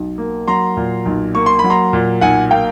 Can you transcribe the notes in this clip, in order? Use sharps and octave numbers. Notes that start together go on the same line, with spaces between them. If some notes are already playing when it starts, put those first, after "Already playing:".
Already playing: B1
A#3
F#3 A#5 C6
A#2
B1
A#3 C#6
C6
B5
F#3
A#5 C6
A#2
B1 F#5 G#5
A#3 F5 G5